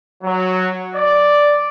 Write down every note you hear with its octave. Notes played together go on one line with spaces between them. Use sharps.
F#3
D5